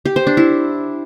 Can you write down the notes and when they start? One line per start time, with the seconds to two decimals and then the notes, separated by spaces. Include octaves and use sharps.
0.05 G4
0.16 C5
0.27 D4
0.37 E4